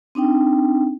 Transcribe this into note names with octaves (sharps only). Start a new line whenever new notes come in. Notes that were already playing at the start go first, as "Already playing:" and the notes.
C4 D4 D#4 G5